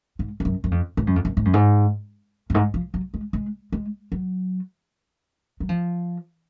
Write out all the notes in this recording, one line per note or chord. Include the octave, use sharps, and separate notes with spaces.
G#2
F2
F#2
F#2
F2
G#2
F#2
F2
F#2
G#2
F#2
G#2
F#2
G#2
F3
F#3
G#3
G#3
G#3
F#3
F#3
F3